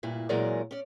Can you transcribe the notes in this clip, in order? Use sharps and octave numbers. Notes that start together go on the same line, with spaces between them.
G2 A#2 E4
A#2 E3 F#3 G#3 A#4 D5
C#4 D5